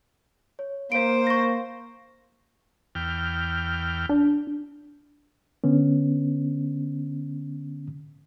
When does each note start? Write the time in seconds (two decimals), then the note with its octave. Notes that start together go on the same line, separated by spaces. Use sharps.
0.59 C#5
0.92 A#3 C5 F5 D7
1.27 C#6 A#6
2.95 E2 G5 F6
4.09 D4
5.64 D3 B3 C#4